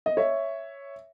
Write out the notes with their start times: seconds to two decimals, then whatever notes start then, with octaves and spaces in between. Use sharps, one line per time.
0.06 D#5
0.17 C#5 E5